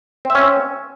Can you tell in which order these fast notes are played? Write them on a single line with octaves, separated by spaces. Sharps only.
C4 E5 C#4